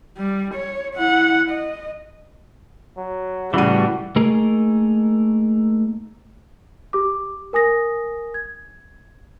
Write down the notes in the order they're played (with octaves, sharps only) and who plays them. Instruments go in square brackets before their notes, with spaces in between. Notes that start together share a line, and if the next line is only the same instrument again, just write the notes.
[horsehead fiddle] G3
C#5
E4 F#5
D#5
[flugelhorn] F#3
[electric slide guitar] A2 E3 [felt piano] C#3 D#7 [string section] G3 [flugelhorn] F#4
[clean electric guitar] A3 A#3 D#4 G#4 A#4
[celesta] G4 D6
A#4 G#5 D#6 A#6
G#6